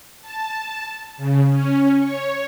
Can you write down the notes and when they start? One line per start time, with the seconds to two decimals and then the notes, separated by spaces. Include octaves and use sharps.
0.22 A5
1.17 C#3
1.51 C#4
2.00 C#5